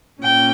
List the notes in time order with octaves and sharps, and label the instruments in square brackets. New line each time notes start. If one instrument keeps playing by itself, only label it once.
[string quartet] A#2 A#3 C#4 G5